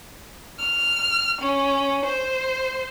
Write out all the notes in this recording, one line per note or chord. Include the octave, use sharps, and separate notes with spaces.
F6
C#4
C5